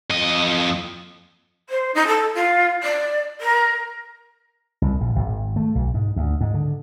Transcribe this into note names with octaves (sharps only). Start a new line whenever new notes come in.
F2 D#5
C5
D#4
A4
F4
D5
A#4
C2
A#1
G#1
A3
B1
G#2
D2
G#2
D3